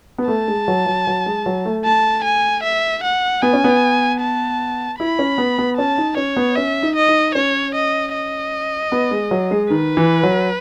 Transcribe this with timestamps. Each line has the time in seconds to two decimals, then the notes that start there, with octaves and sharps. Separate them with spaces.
0.18 B3
0.28 A3 A5
0.48 G#3
0.68 F#3
0.86 F#3
1.07 F#3
1.26 G#3
1.46 F#3
1.65 A3
1.85 A3 A5
2.24 G#5
2.64 E5
3.03 F#5
3.42 B3 G#5
3.53 C#4
3.64 B3
4.21 A5
4.99 E4 B5
5.19 C#4
5.38 B3
5.59 B3
5.77 C#4 A5
5.98 D#4
6.17 C#4 C#5
6.37 B3
6.56 C#4 E5
6.83 D#4
6.96 D#5
7.08 D#4
7.34 C#4 C#5
7.75 D#5
8.14 D#5
8.92 B3
9.11 G#3
9.31 F#3
9.51 G#3
9.70 D#3 B4
9.97 E3
10.23 F#3